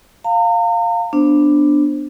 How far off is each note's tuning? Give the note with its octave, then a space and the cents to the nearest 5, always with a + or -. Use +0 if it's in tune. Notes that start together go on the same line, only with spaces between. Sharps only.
F5 +5 A#5 -40
B3 +0 D4 +0 C5 +0